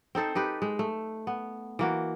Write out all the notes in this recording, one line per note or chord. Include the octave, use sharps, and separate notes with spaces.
C4 D#4 A4 C5
D#4 G4 B4
G#3
A3
B3
E3 A#3 F#4